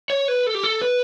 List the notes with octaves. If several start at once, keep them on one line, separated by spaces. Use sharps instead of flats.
C#5
B4
A4
G4
A4
B4